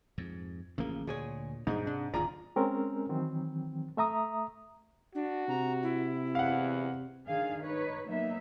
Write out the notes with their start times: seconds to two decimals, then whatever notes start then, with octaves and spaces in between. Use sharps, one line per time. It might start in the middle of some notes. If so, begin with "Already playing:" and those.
0.18 F2 G#2
0.78 A1 C#3 F3 A#3
1.07 D2 A#2 G#4 C#5
1.67 G#2 B2 G3 D4 D#4
1.87 C3 D4
2.14 D1 D#2 A2 F4 G#4 D5 A#5
2.56 G#3 C4 C#4 A#4
3.09 D#3 E3 F#3 C4
3.97 A3 E5 A#5 D#6
5.15 D4 F#4
5.49 C3 A#5
5.83 E4
6.35 E2 F5 F#5
7.27 D#3 D4 G#4 F5
7.64 D#4 B4 C#5
8.09 F#3 A#3 B3 D#4 E5